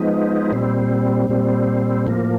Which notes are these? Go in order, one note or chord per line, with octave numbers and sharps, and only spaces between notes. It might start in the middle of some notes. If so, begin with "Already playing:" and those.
Already playing: F3 G#3 B3 D#4
A#2 G3 C4
A#2 G3 C4
A2 F3 A#3